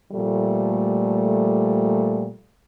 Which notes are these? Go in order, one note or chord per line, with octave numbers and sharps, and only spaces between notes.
A#2 F3 G3 A3